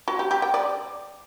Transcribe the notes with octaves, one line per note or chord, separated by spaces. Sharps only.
F#4
G4
G4
G5
D5